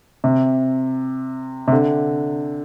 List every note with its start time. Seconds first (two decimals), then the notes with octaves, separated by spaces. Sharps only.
0.24 C3
1.68 C3
1.72 D3